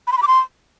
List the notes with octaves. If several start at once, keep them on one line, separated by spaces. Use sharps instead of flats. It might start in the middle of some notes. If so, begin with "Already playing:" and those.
B5
C6
B5
D6
C6